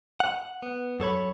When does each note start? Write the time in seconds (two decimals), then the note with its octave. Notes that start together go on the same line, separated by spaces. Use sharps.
0.20 F#5
0.62 B3
1.00 F#2 A4 C#5 B5